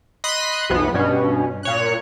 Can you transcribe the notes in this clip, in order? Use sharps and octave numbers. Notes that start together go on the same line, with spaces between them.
D#5 B5 C6 D#6 F#6
B1 F2 E3 B3
G2 B2 C#4
A#2 C#5 F#6